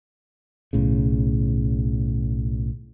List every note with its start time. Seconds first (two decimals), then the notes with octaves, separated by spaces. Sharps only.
0.73 B1 A2 C#3